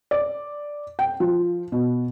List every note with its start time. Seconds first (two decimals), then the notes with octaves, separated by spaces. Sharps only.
0.11 D5
0.99 G5
1.20 F3
1.72 B2